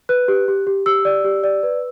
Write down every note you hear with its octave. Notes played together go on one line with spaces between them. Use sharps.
B4 F#6
G4
G4
G4
G4 E6
D5
G4
D5
B4